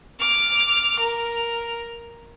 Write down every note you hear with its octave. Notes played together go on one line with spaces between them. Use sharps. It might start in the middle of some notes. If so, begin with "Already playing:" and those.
D6 F6
A#4